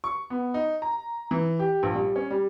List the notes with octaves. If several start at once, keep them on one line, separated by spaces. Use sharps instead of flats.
C#6
B3
D#4
A#5
E3
G4
A#1
G3
C#4
G3